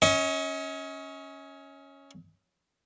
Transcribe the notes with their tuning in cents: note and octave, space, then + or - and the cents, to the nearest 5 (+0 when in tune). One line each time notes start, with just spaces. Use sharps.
C#4 +0 D#5 +40